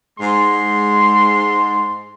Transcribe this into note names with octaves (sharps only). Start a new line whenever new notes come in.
G#2 G#3 C6